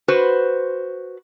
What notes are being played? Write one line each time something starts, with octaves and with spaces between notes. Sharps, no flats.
F#4 B4 C5